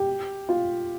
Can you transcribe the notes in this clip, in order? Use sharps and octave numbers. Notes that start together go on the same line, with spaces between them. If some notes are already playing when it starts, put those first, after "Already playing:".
Already playing: G4
F4